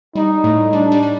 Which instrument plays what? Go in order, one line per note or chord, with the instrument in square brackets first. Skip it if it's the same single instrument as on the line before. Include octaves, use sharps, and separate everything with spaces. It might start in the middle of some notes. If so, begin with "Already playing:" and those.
[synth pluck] G3 [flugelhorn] D#4
[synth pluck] A2 A3
[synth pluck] G3 [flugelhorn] D4
[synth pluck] G3
G3